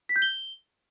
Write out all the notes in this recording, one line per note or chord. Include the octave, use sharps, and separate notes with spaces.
B6
G6
G7